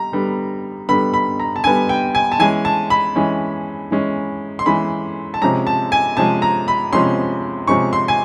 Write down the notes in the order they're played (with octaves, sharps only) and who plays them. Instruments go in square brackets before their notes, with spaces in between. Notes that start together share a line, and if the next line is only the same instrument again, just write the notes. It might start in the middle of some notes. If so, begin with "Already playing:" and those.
Already playing: [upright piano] G3 A#5
D3 G3 B3
D3 G3 B3 B5
B5
A#5
A5
D3 G3 B3 G#5
G5
G#5
A5
E3 G#3 C#4 G#5
A5
B5
E3 G#3 C#4
E3 G#3 C#4
C6
E3 G#3 C#4 B5
A5
C3 F3 G#3 C#4 A#5
A5
G#5
C3 F3 G#3 C#4 A5
A#5
B5
C3 F3 G#3 C#4 C6
C3 F3 G#3 C#4 C#6
C6
G#5